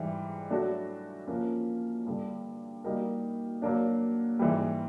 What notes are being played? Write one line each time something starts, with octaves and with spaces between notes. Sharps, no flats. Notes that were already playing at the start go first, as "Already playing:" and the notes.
Already playing: G#2 E3 G3
F#3 A3 D4 F#4
F3 A#3 C#4
G2 D3 G3
G3 A#3 D#4 F#4 A#4
F#3 A#3 D4
G#2 E3 G3